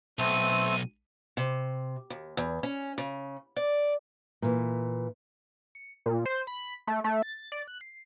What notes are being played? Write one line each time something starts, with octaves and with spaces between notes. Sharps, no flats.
B1 A3 C4 A4 D#7
C3
D#2
E2
C#4
C#3
D5
A#2 E3
C#7
A#2
C5
B5
A3
A3
A6
D5
F#6
C7